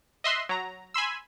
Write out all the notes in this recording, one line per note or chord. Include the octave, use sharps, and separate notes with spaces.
D#5 E5 C6 F#6
F#3 A#5
G#5 B5 C6 E6